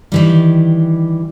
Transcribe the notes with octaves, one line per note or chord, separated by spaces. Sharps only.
D#3 E3 G3